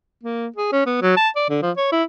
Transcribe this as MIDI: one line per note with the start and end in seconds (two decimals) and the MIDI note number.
0.23 0.47 58
0.56 0.72 68
0.72 0.84 61
0.86 1.01 59
1.02 1.13 54
1.17 1.29 81
1.36 1.47 74
1.49 1.59 50
1.62 1.71 53
1.77 1.89 73
1.92 2.03 64